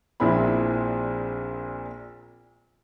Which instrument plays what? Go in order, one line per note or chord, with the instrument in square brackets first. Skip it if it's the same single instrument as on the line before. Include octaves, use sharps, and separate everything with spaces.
[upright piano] A#1 A#2 C4 E4 B5